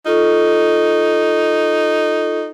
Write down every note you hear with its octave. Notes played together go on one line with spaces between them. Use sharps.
D#4 F4 A4 C#6